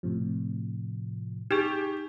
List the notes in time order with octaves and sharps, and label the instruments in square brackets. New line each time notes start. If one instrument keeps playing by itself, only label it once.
[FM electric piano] A2 C3 F3
[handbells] D#4 G#4 [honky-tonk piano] G4